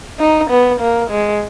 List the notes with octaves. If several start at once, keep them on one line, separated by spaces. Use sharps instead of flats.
D#4
B3
A#3
G#3